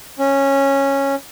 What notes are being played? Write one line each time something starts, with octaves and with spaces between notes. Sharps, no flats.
C#4